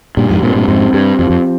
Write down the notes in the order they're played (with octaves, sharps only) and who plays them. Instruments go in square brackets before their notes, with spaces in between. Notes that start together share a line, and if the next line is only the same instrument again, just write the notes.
[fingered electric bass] G2 A#2 [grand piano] G4
[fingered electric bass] F2 G#2
[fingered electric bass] G2 A#2 [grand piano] C4
[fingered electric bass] G2 A#2
[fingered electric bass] F2 G#2 [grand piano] C4
[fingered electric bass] G2 [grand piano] G4
[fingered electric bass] F2 [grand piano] F3
[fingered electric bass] F2